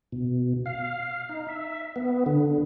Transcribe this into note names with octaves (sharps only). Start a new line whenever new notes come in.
B2
F5
D#4
E5
B3
D3